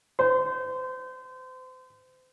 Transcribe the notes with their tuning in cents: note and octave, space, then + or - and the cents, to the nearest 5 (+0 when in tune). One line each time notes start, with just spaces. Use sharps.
C5 -35